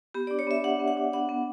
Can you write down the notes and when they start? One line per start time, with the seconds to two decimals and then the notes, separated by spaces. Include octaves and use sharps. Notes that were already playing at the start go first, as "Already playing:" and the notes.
0.14 B3 G4
0.27 D5
0.31 D4
0.39 C#5
0.47 B3 E5
0.64 D4 F#5
0.79 B3
0.88 F#5
0.97 D4
1.13 B3 F#5
1.29 B3